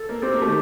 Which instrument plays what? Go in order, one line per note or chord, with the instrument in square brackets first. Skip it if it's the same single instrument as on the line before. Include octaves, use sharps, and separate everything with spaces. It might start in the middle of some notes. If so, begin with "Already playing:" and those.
Already playing: [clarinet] A4
[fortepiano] A#3
[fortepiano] C4 [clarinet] G4
[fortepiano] A#3
A3
D#3